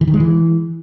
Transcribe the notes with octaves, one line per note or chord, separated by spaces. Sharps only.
E3
D#3
G#3
E3